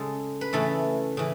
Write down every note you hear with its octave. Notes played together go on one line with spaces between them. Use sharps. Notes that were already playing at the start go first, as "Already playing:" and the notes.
Already playing: C#3 G#3 A4
B4
C#3 E3 A3 A4
C#3 E3